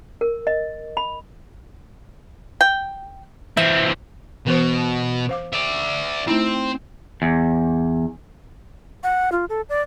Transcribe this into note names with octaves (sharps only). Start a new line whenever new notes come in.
A#4
D#5
B5
G5
E3 C4 E5
B2 E3 B3 C5
C5 F5 D6
D5 E5
A3 C4 D#4 E4
E2
F#5
F4
A4
D5